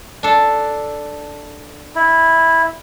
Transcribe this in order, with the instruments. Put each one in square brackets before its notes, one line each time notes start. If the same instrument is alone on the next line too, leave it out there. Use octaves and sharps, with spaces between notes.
[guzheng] D4 A4
[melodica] E4